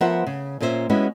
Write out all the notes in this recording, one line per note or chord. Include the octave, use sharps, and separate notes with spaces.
F3 B3 A#4 C5 E5 F#5
C#3
A#2 A#3 C#4 C5 E5
G#3 B3 C#4 E4 F#4 G4